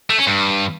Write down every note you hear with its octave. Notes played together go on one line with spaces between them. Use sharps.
A3
C#4
G2